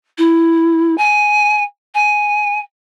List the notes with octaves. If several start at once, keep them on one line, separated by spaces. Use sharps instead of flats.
E4
G#5
G#5